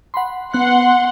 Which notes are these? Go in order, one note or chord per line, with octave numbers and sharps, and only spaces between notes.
F#5 B5 C6
B3 F#5 C6 F#6